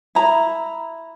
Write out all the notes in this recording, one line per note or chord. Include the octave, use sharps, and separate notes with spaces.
E4 A#5